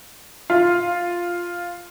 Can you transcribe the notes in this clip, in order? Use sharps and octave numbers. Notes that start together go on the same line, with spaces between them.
F4